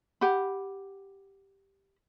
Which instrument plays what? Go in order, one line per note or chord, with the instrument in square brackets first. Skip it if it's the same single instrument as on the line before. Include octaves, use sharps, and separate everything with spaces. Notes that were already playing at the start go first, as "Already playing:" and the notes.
[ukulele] G4 F#5 B5